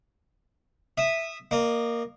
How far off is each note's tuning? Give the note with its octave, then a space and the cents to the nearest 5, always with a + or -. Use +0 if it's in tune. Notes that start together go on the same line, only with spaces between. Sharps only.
E5 +0 D#6 -15
A#3 +0 D#5 -30